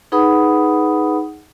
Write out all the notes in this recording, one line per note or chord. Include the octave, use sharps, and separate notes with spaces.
D#4 G#4 B4 F#5 B5 D#6